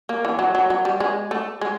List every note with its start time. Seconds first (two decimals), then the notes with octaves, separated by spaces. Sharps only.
0.09 A#3
0.25 E3
0.39 F#3
0.55 F#3
0.70 F#3
0.85 G3
1.00 G#3
1.31 A3
1.61 G#3